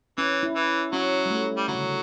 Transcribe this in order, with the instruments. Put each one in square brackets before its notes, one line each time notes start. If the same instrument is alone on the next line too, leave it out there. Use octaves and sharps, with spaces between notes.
[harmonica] E3 [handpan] C#4
[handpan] E4
[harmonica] E3
[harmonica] F#3 [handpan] C#4
[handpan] G3
A3
[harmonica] G3
[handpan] D3 [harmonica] F#3
[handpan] C#3
D3